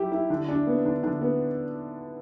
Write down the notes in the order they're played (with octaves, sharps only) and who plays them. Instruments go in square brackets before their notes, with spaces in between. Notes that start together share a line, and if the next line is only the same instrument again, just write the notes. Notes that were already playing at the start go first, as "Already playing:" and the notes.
Already playing: [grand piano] F#3 E4 G4
E4
D3
D4
B3
D3
D3
B3